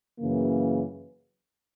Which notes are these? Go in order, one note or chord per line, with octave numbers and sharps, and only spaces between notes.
F#2 C#3 E3 A#3